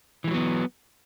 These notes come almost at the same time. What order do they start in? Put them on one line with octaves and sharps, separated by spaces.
E3 G#3 F#3 B3